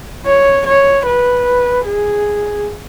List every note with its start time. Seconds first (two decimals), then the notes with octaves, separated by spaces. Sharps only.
0.25 C#5
0.66 C#5
1.06 B4
1.86 G#4